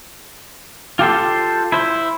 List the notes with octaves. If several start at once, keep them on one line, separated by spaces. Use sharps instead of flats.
F4 G4 A4 C5
E4 C5